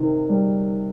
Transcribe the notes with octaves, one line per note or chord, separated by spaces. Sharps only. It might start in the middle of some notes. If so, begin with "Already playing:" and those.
Already playing: C3 D#3
G3